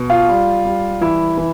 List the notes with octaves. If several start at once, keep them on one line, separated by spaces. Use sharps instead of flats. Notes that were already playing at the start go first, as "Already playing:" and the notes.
Already playing: B2
F4
G3
G3
E3 E4
E3